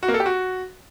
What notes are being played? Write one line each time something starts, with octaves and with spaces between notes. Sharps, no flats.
F#4
A#3
A4
G4
F#4